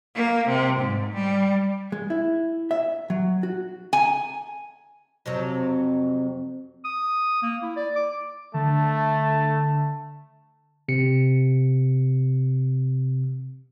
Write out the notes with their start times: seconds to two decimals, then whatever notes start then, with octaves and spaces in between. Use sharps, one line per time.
0.15 A#3
0.48 C3
0.80 G#2
1.13 G3
1.92 G#3
2.10 E4
2.71 E5
3.10 F#3
3.43 F#4
3.93 G#5
5.26 F2 C3 F#3
6.85 D#6
7.42 A#3
7.63 E4
7.76 D5
7.96 D6
8.54 D3 A3 A5
10.88 C3 C#7